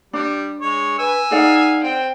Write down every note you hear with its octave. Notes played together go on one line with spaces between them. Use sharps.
G3 D4
G#3 C#5
B4 G#5 E6
D#4 G#4 D5 F5 F#5
C4 G5